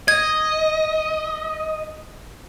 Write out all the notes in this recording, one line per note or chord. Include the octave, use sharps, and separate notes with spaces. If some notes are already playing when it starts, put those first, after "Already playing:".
D#5 G#6